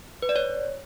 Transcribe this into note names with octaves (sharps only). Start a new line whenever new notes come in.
B4
D5
C#5